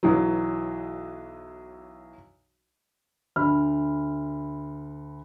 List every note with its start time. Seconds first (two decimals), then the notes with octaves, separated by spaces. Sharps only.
0.03 B1 E3 F#3
3.36 D2 B5 F6